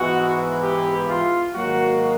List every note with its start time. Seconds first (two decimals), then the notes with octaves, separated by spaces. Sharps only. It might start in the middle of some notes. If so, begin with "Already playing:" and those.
Already playing: G#2 E3 G#3 B3 E4 F#4
0.63 G4
1.09 F4
1.55 G#2 D#3 F#3 A#3 F#4